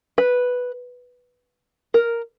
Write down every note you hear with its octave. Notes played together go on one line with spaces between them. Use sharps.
B4
A#4